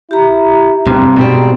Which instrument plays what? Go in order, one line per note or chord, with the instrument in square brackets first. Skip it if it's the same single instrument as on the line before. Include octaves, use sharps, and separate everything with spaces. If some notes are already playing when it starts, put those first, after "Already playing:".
[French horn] E4 [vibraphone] G4 A#5
[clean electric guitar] G2 C3 [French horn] C4
[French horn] G#2 [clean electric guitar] B2 G3 C4